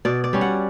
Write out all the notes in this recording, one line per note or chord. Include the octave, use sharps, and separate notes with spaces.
B2 D5
D5
G3 C#4
F#5